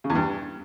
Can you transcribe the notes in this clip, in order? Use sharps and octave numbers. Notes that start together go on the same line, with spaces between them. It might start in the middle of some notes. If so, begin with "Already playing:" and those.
C#3
E2
G2